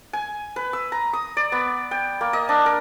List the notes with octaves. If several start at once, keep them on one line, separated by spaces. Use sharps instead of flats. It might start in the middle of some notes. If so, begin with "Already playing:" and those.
G#5
B4
E6
A#5
D#6
D5
B3
G5
A#3
D#5
D4
A#4